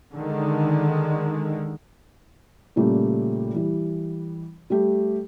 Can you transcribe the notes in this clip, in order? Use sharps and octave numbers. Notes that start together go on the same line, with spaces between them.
D3 D#3 G#3
A#2 C#3 G3 A3 A#3
E3 G3
G3 A3 G4